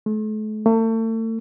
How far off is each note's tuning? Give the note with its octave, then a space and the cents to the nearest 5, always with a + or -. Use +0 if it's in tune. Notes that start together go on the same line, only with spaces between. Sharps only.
A3 -40
A3 +40